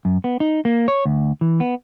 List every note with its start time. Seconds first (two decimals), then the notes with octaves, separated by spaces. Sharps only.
0.05 F#2
0.24 B3
0.40 D#4
0.65 A#3
0.88 C#5
1.05 D2
1.41 E3
1.60 B3